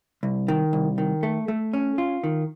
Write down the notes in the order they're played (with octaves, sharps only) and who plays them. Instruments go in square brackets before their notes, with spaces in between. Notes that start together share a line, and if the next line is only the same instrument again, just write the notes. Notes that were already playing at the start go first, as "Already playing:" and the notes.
[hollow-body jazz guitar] C2
D#3
C2
D#3
A3
A3
C#4
F4
D#3